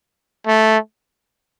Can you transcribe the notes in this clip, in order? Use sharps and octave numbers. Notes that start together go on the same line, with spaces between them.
A3